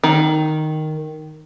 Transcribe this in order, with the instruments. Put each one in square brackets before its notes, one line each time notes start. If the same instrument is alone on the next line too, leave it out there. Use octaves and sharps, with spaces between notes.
[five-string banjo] D#3